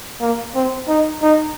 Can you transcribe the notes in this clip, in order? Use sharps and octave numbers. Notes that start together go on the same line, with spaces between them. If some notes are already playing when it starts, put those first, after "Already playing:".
A#3
C4
D#4
D#4